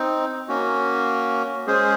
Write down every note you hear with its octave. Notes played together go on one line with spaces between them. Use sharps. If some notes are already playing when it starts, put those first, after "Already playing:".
Already playing: C4 D#4
A#3 C#4 F#4
G#3 C#4 G#4 C5